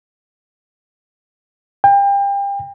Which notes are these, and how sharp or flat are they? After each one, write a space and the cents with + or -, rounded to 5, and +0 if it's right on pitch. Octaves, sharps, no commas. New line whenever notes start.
G5 +30